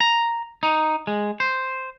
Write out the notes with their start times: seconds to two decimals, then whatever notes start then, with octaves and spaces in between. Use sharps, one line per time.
0.01 A#5
0.63 D#4
1.07 G#3
1.40 C5